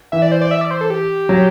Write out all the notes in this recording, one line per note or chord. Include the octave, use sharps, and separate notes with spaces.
E3 E5
D5
C5
D5
E5
D5
C5
A4
G4
F#3